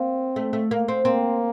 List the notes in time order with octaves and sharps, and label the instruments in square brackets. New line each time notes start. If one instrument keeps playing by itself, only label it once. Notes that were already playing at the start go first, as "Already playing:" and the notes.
Already playing: [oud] A#3 [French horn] C4
[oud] A3
A3
A#3
C4
[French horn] A#3 [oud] C4